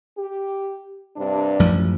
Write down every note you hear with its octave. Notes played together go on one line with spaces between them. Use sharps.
G4
G2 C3 D4
A1 F#2 F3